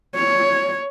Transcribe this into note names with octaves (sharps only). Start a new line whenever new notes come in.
C#5